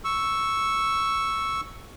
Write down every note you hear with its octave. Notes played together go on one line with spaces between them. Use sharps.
C#6 E6